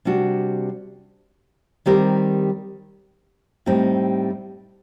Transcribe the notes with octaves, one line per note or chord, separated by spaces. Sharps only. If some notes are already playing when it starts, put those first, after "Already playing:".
C3 G3 D4 F#4
D#3 G3 C4 G4 A#4
A2 G3 C4 D#4 G4